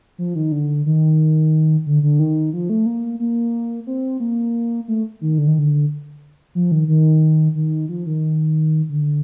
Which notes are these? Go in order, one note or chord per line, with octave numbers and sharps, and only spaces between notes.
F3
D#3
D3
D#3
D3
D3
D#3
F3
A3
A#3
A#3
C4
A#3
A3
D#3
D3
D#3
D3
F3
D#3
D#3
D#3
F3
D#3
D3